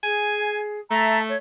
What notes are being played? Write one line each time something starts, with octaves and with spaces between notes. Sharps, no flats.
G#4 G#5
A3 E5 A5 A#5
C#5